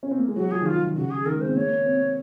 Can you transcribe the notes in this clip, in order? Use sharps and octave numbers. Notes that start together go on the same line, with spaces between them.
C#4
C4
A#3
G#3
F#3 F#4
F3 G#4
D#3
F3 F4
D#3
C#3 F#4
G#4
D#3 A#4
G#3
C4 C5
A#3 C#5
C4